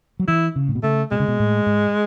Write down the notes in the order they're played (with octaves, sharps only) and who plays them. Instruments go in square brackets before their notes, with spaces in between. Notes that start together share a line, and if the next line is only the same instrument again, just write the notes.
[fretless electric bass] F#3
[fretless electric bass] E3 [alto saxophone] E4
[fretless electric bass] C#3
A2
B2
[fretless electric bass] C#3 [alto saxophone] A3
[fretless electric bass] B2 [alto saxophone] G#3
[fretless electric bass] C#3
B2
A2
G#2